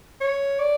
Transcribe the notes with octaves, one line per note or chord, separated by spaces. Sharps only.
C#5
D5